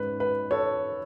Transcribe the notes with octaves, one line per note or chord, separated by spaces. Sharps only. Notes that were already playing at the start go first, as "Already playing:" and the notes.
Already playing: G#2 G#3 C#4 B4
B4
A4 C#5